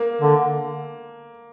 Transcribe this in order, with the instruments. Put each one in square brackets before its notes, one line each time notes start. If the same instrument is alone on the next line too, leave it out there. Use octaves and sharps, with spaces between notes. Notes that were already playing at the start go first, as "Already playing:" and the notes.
Already playing: [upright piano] A#3
[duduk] D3